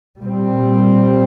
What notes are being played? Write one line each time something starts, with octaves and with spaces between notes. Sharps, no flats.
A#2 G3 C4